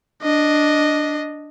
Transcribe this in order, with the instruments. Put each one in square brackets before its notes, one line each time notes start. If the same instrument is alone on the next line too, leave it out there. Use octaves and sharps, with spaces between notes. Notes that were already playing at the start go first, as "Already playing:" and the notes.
[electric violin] D4 D#5